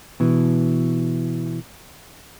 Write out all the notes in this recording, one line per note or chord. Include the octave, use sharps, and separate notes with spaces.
B2 E3